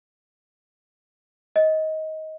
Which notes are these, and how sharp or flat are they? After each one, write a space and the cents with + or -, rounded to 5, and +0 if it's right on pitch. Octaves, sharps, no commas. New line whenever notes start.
D#5 +20